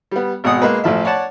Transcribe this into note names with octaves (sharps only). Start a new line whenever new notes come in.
G3 B3
G#1 B2 F#5 D#6
G#3 A#3 B4
A1 F3 E5
C#5 D5 F#5 A5